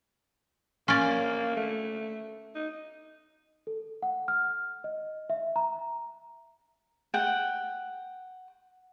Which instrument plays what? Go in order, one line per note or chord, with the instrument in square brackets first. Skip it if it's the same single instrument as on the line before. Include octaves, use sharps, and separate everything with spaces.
[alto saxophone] A#3 [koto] C#4 D5
[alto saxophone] A3
D#4
[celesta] A4
F#5
F6
D#5
E5
A#5
[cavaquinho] F#5 G5